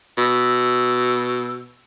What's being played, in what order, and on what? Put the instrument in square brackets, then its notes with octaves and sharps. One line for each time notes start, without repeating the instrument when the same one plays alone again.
[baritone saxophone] B2 [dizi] E6